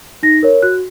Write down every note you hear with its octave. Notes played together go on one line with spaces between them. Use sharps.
D#4 A#6
A#4 C#5
F#4 F#6